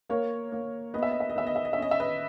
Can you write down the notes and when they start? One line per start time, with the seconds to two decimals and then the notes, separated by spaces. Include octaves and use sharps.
0.09 A#3 A#4 C#5
0.52 A#3
0.94 B3 D#5
1.03 E5
1.11 D#5
1.20 E5
1.29 D#5
1.36 B3 E5
1.47 D#5
1.56 E5
1.65 D#5
1.73 E5
1.78 C#4 D#5
1.91 E5
2.00 B4 D#5